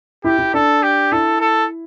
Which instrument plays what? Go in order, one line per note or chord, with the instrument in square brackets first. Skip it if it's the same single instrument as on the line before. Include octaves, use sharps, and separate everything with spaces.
[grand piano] E4 [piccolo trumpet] G4
[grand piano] E4
[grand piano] D4 [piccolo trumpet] A4
[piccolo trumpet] G4
[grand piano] E4 [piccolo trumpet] A4
[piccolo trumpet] A4